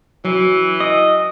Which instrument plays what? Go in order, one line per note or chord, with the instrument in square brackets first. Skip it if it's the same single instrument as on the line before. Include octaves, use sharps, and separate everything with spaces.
[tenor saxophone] E3 [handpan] F#3
[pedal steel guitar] D#5